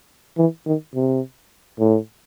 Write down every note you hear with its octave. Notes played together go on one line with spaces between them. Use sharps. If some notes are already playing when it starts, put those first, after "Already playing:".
E3
D#3
C3
A2